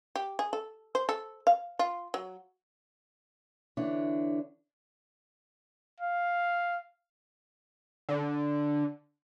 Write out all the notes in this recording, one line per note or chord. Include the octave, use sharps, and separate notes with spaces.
G4
G#4
A4
C5
A4
F5
F4
F#3
D3 E3 D4 E4 C#5
F5
D3